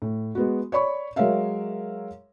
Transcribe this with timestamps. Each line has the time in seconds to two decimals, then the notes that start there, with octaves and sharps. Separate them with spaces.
0.02 A2
0.35 G#3 B3 F#4
0.72 C#5 D5 B5 C#6
1.16 F#3 G#3 A#4 C#5 E5 F5